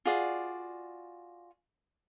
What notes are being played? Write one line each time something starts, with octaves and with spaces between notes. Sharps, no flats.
F4 F#4 G#4 D5